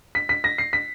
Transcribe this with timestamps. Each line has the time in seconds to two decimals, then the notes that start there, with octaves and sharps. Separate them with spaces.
0.15 B6
0.29 B6
0.44 A#6
0.58 C7
0.73 B6